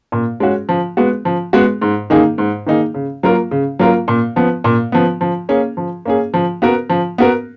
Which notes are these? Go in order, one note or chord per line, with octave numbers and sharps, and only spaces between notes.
A#2
G#3 C#4 F#4
F3
G#3 B3 F#4
F3
G#3 B3 F#4
G#2
D#3 A#3 D#4 G#4
G#2
D#3 A#3 D#4 G#4
C#3
F#3 A#3 F4 A#4
C#3
F#3 A#3 F4 A#4
A#2
F3 B3
A#2
F3 B3
F3
A#3 C#4 G#4
F3
A#3 C#4 G#4
F3
B3 F#4 A#4
F3
B3 F#4 A#4